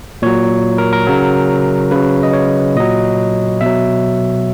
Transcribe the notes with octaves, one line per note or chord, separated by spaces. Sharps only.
A#2 F#3 C#5
A#4
A#4
C#3 F#3
C#3 F#3 B4
D#5
C#5
A#2 F#3 D#5
B2 F#3 E5